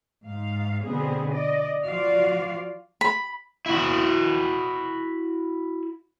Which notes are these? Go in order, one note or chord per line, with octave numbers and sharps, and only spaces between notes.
G#2 F5
B2 D3 B3 C4 G#4
D5 D#5
F3 F4 F#4 D5 F5
B5
E4 F#4